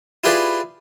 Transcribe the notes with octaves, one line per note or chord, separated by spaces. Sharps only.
E4 F4 G4 G#4 B4 D5